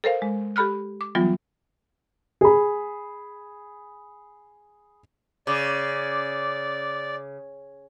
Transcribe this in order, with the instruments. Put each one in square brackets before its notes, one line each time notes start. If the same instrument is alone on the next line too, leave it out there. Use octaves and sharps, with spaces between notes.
[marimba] A4 A#4 C5 F5
G#3
G4 A4 B5 F6 F#6
D6
E3 F#3 G3 B3 F4
[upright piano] G#4 B5
[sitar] C#3 [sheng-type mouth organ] D5 [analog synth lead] D6